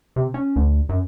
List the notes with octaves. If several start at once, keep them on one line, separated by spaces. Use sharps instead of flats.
C3
C#4
D2
F#2